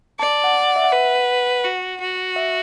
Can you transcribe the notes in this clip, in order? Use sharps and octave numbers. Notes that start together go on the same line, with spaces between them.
D5 A5
F#5
F#5
E5
F#5
B4
F#4
F#4
E5